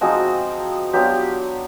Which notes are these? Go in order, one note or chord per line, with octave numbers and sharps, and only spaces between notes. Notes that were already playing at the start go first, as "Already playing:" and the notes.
F3 G#3 C4 D#4 F#4
F#3 B3 D4 F4 G4